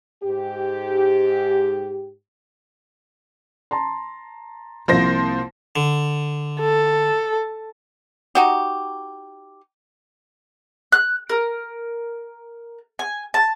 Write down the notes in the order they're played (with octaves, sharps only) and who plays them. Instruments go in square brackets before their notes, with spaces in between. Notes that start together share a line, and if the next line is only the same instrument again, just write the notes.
[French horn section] G#2 G4
[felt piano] A5 A#5 C6
[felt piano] C2 A#3 [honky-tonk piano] F3 C5 A#6
[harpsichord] D3
[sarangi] A4
[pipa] D#4 F#4 G4
[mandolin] F#6
A#4
G#5
A5